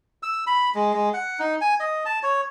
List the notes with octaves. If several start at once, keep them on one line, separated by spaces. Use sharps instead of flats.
E6
B5
G#3
G#3
F#5
D#4
G#5
D#5
A5
C#5